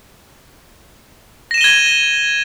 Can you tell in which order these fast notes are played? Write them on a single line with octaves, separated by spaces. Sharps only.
A#6 E7 D#7 G7 G#6